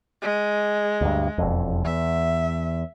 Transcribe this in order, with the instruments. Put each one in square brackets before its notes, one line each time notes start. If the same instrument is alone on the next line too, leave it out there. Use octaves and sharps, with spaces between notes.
[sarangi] G#3
[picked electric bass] D2 G2
E1 F2
[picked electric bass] E2 [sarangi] E5